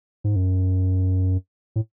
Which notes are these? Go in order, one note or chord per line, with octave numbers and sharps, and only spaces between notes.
G#2
F#2
A2